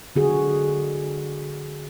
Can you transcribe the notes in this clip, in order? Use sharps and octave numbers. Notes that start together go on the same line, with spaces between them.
D3 F#4 G#4